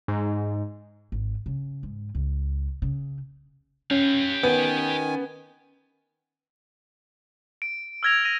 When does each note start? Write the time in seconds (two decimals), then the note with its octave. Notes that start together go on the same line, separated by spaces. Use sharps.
0.08 G#2
1.12 G#1
1.46 C#3
1.83 G#2
2.15 C#2
2.82 C#3
3.91 C#4 G4 F5
4.43 D#3 B3 G#5
7.62 D7
8.03 E6 F6 G#6 A#6 F7
8.25 A#6 D#7